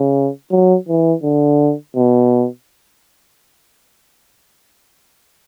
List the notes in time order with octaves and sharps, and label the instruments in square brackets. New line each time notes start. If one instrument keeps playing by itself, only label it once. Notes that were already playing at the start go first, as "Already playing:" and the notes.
Already playing: [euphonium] C#3
F#3
E3
D3
B2